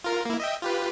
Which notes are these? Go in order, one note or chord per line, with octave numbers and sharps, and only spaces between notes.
F4 A#4
A#3 E4
D#5 E5 G5
F4 G4 B4